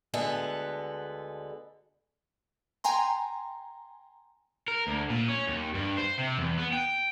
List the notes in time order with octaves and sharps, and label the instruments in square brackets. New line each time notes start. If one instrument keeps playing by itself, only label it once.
[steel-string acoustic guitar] D2 D3 G#3 B3 E5 F#5
[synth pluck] G5 G#5 A#5 C6
[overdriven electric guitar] A#4
D2
A#2
C#4
D#2
G2
C5
C3
E2
B3
G5